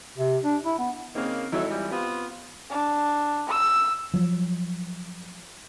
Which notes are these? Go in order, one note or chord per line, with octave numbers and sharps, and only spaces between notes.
C3
D4
E4
B3
C#3 A#3 C4 D#4
G#1 F#3 D#4 E4 A4
E3 F3 G3
B3 C4 F4 G4
D4
E6
F3 F#3